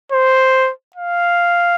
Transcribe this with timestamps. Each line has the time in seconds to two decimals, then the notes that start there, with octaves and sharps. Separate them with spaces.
0.12 C5
0.96 F5